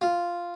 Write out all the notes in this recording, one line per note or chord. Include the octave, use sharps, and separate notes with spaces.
F4